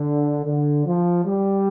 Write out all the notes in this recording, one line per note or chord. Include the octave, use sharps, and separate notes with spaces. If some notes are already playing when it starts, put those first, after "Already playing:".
Already playing: D3
D3
F3
G3